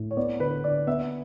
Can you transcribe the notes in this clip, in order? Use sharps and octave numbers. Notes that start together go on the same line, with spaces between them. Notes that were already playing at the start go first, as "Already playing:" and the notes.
Already playing: A2
C#5
B3 D5
D3 B4
D3 D5
B3 E5